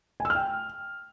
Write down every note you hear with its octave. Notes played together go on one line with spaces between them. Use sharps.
G#5
E6
F6
G5